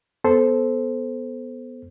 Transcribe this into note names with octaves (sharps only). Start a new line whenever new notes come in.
B3 A4 C5